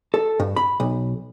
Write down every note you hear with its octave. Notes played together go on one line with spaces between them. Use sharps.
A4
G2
B5
B1